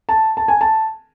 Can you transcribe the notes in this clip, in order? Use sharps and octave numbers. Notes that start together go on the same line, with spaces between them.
A5
A5
G#5
A5